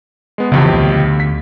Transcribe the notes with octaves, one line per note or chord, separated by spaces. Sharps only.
G#3 B3
B1 F2 C#3 E3 G4
D2
B6